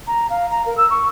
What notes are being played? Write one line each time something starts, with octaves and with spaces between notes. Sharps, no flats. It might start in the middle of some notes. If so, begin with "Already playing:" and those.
A#5
F5
A#5
A#4
E6
C#6